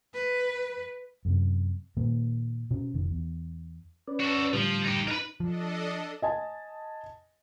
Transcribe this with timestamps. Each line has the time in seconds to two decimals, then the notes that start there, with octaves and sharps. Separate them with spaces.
0.14 B4
1.25 F#2 C3
1.97 A#2 D#3 A#3
2.71 B2 C#4
2.94 F1 D#3
3.11 E2
4.08 C#4 B4 D5
4.20 F#4 A4
4.53 A2 D3 F3 G3
4.84 D#4 G4
5.08 D#4 A#4 B4
5.40 F3 D4 A4 D#5
6.22 D#5 G#5 A5